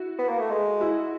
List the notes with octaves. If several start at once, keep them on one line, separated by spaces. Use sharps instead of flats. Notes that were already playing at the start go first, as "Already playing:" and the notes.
Already playing: E4 F#4
B3
A#3
A3
G#3
E4 F#4